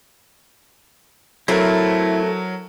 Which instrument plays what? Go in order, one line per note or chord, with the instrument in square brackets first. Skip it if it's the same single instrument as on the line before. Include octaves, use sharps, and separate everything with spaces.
[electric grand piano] F#3 A#4 [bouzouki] A3 C4 [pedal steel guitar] E4